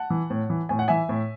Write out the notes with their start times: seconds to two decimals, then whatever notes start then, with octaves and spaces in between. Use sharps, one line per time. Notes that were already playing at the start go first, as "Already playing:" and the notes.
Already playing: F#5 A5
0.10 E3
0.30 A2
0.50 E3
0.69 A2 G#5
0.79 F#5
0.88 E3 E5 G#5
1.09 A2